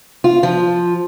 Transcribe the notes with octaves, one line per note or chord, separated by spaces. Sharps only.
F4
F3